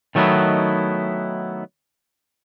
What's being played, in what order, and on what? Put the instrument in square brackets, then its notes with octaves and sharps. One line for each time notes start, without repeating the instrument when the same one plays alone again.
[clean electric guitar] D#3 F#3 A3 B3 D#4 E4